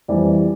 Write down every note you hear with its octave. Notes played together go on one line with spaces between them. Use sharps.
F2 E3 G3 D5